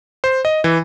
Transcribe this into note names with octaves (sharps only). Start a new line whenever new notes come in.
C5
D#5
E3